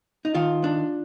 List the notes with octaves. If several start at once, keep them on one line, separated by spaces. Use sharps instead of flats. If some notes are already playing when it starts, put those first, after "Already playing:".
D#4
D#3 F4
D4